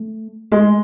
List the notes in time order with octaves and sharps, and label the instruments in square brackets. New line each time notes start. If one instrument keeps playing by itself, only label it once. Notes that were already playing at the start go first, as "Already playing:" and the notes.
Already playing: [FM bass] A3
[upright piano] G#3 [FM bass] A3